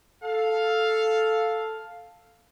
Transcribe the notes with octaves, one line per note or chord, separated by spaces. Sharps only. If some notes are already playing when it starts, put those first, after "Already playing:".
A4 F5